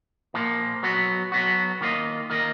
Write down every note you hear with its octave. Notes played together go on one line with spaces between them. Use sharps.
A#2 F3 A#3
F#3 B3 F#4
F#3 B3 F#4
D#3 A#3 F4 A#4 D#5
D#3 A#3 F4 A#4 D#5